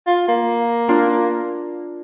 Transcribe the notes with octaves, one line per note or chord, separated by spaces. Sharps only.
F4
A#3
D4 F4